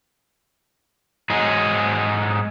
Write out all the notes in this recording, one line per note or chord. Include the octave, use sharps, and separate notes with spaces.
G#2 F#3 D#4 G#4